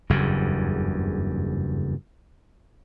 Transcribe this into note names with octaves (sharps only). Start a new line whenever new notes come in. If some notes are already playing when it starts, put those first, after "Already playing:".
F#1 E2 G2 C#3